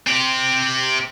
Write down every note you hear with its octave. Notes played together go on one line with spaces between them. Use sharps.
C4 G4